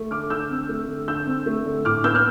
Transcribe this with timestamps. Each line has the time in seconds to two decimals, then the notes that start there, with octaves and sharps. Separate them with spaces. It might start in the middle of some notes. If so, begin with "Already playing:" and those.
Already playing: A3
0.11 D3 D6 F6
0.30 D3 E6 G6
0.51 C4
0.69 A3
0.88 D3
1.08 D3 E6 G6
1.27 C4
1.46 A3
1.65 D3
1.85 A2 D6 F6
2.04 B3 E6 G6
2.15 F6